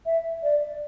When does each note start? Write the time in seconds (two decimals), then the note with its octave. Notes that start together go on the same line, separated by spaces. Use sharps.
0.06 E5
0.43 D5